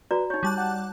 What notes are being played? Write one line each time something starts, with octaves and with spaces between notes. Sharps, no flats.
F#4 B4 D5 A#5
D#4 C#5 C#6
G3 A5 F#6
F#5